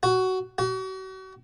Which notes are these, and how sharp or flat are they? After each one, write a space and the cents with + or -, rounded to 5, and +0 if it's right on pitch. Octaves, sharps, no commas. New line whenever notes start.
F#4 +15
F#4 +40